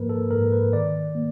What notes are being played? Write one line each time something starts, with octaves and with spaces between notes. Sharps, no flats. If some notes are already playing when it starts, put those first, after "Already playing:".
Already playing: G#2 F3 A#3 A#4 B4
A4
G#2 A#4
B4
D#3 D5
A#3